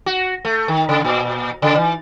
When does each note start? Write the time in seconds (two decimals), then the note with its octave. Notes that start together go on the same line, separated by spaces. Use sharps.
0.06 F#4
0.45 A3
0.68 D#3
0.89 C#3
1.04 A#2
1.62 C#3
1.76 E3